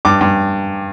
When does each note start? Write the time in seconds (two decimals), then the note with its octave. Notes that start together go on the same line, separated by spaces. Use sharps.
0.05 G2 D6
0.21 G2